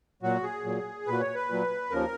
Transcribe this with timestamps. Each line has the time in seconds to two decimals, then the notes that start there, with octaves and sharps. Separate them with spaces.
0.23 A#2 F#3 F#4
0.43 G#4
0.64 A#2 F#3
1.07 A#2 F#3 B4
1.20 C#5
1.35 B4
1.48 A#2 F#3
1.90 D#2 C#3 F3 A#4